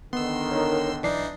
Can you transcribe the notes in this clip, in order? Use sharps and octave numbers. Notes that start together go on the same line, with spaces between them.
D3 D#3 B3 C6 E6
D#4 A#4 C#5
B1 E3 D4 D#4 D5 C7